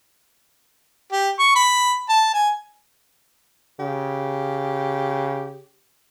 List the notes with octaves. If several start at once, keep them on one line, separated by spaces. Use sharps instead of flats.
G4
C#6
B5
A5
G#5
C#3 G4